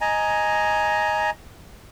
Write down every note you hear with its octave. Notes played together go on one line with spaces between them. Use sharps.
D#5 G#5 A#5